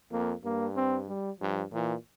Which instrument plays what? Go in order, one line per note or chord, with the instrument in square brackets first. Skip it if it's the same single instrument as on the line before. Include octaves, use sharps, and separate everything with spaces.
[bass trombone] F2 [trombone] A#3
[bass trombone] G2 [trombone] A#3
[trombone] C4
G3
[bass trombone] G2 [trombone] F3
[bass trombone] A#2 [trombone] E3